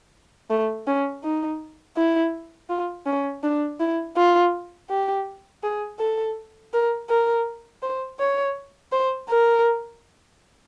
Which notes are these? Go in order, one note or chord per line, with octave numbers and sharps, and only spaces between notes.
A3
C#4
D#4
E4
F4
C#4
D4
E4
F4
G4
G#4
A4
A#4
A#4
C5
C#5
C5
A#4